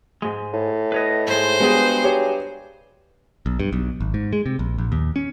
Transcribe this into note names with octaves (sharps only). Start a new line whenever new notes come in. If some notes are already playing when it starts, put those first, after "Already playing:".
G#2 G#3
A2
B4 C#5 D#5
G#2 G#3 C5
G2 G#3 B3 F#4 G#4
G4 C#5
B1
G2
B1
G#1
G#2
G#3
C3
A#1
A#1
D#2
C#4